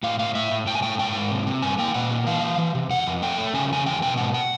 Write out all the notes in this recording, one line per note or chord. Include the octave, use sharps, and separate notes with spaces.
A2 F5
A2 F5
A2 E5
A2
A2 G5
G#5
A2 G5
G#2 G5
G#2
C3
C3
G2 G#5
A#3 G5
A#2 F#5
A#3
E3 F5
E3
E3
C3
F2 F#5
F2
A3 G5
A3
C#3 G#5
F2 G#5
E2 G5
B2 G5
G#2 F#5
F#5